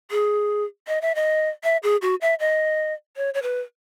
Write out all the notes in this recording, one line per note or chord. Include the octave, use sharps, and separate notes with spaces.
G#4
D#5
E5
D#5
E5
G#4
F#4
E5
D#5
C#5
C#5
B4